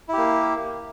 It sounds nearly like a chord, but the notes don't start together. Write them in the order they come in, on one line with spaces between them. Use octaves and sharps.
E4 G4 A#3